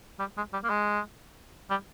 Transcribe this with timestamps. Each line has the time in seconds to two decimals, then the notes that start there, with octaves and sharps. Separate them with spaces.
0.19 G3
0.37 G#3
0.53 G3
0.64 A#3
0.70 G#3
1.70 G3